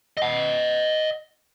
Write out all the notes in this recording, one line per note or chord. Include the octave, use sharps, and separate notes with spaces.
D#5 F#5